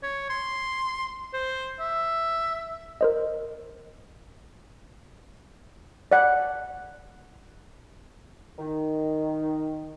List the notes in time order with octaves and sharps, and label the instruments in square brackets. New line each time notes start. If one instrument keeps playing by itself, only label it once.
[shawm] C#5
C6
C5
E5
[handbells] A#4 C5 D#5
[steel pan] D5 F#5
[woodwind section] D#3